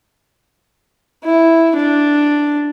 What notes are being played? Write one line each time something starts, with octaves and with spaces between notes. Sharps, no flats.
E4
D4